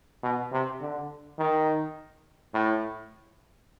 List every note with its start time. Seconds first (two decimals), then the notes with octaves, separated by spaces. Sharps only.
0.23 B2
0.52 C3
0.81 D3
1.39 D#3
2.54 A2